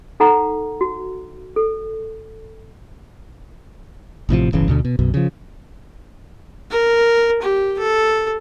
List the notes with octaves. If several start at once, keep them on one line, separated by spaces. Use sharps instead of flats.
D#4 A4 F#5 A#5
F#4
A4
A1 A2 C3 F3
D1 G1 C#3 E3
D2 B2 D3
B2
B1 F#2 B2
C#3 F3
A#4
G4
A4